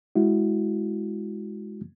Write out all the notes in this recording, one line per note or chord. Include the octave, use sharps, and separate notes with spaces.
G#3 E4 F#4